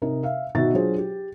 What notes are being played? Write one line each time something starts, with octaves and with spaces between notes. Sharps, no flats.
C3 D#4 A#4
E5 F5
B2 D#3 F#4 E5 A6
F#3 D4 F4 G#4 C5
G4